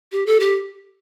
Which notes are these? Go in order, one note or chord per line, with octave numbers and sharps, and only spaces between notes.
G4
A4
G4